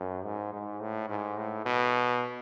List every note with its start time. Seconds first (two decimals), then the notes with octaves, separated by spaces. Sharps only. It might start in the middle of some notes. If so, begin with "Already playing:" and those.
Already playing: F#2
0.24 G#2
0.53 G#2
0.81 A2
1.09 G#2
1.37 A2
1.66 B2